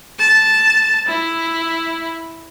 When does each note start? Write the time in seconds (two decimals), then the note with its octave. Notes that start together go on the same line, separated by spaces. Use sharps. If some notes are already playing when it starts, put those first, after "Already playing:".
0.19 A5
1.07 E4